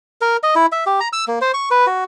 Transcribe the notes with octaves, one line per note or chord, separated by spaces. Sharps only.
A#4
D#5
E4
E5
G4
A#5
E6
A#3
C5
C#6
B4
F#4